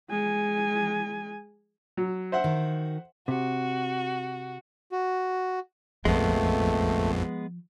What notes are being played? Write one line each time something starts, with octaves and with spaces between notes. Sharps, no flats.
G#3 G#5
F#3
C5 E5 F#5
D#3 F#4
C3 F#4
F#4
A#1 F2 F3 G#3 A3 B3